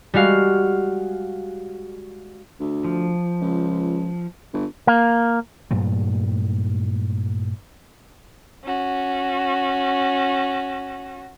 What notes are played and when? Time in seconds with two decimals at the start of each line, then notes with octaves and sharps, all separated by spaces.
0.14 G3 G#3 F#4 F5
2.60 D2
2.84 F3
3.41 C#2
4.53 G1
4.87 A#3
5.71 G2 A#2 F#3 A3
8.64 C#4 F#4